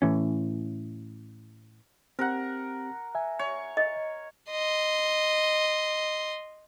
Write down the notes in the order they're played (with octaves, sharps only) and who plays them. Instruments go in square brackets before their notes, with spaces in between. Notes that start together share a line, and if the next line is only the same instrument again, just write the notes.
[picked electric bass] A2 E3 C#4
[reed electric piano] C4 G4 [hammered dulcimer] A#4 F#5
[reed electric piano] E5 G#5
[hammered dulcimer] C#5
[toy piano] D#5
[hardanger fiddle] D#5 C6